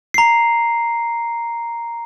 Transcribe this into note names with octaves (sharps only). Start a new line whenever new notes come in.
A#5 C7